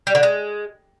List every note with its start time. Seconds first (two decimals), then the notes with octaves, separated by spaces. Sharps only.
0.07 G3
0.15 D3
0.23 G#3